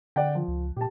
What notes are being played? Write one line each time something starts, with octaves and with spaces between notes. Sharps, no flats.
D3 D5 F#5 G5
F3
C#2
A#2 G4 A5